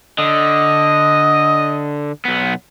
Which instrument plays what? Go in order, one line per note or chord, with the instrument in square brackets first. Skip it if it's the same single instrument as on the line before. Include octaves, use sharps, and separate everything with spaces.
[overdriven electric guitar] D3 [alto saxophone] D#5
[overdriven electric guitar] B1 B3